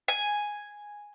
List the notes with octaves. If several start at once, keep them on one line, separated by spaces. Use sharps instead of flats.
G#5